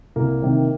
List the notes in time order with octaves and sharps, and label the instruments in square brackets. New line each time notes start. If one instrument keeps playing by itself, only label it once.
[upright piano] C2 [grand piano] A#3
[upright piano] C3 D#3